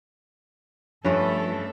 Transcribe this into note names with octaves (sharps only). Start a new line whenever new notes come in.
G2 F3 A3 C#4 A4 B4 E5